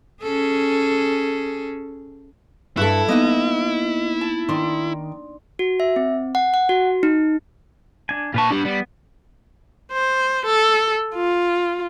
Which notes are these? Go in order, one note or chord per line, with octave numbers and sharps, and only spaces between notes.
C#4 G#4 A4
G2 E4 F#4 A4
A#3 B3 D#4 D#5
A5
D#3 D4 C6
F#4
E5
C4
F#5
F#5
F#4
D#4
D4 G#5
A#2 F4 B4 A5 C#6
B3 D4 G4 F#5
G3
C5
A4
F4